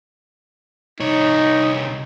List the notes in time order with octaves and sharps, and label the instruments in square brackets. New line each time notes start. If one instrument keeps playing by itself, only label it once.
[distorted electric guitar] C2 C#5 [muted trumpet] D#4